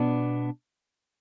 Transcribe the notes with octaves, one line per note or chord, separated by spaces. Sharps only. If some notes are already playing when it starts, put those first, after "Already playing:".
Already playing: B2 B3 D4